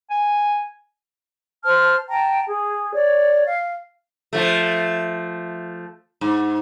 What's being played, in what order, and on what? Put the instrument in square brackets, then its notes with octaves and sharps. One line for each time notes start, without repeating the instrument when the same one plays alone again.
[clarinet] G#5
[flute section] C5 A5 F6
G5 A5 A#5
G#4
C#5 D5
F5
[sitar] F3 A3
G#2